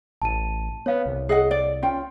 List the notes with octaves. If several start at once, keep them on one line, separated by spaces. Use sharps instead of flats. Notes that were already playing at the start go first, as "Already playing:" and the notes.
A1 A5 D#7
B3 C#5 F5
C2
G#4 D#5 F#5
D5
C#4 F4 G5